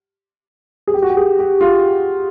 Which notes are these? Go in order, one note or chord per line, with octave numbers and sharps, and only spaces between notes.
G#4
G4
F#4
G4
G#4
G4
F4